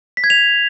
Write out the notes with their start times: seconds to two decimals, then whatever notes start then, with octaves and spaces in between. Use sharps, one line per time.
0.17 B6
0.24 G#6
0.30 F7